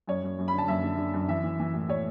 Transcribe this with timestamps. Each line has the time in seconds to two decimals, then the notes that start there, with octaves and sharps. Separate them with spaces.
0.07 F#2 C#5
0.23 F#2
0.39 F#2
0.48 B5
0.53 D3
0.58 A5
0.68 F#2 E5
0.84 D3
0.98 D3
1.14 F#2
1.28 E3 E5
1.43 E3
1.59 E3
1.74 A2
1.89 A2 C#5